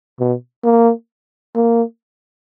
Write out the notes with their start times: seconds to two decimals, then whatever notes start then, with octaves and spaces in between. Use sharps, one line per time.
0.20 B2
0.64 A#3
1.55 A#3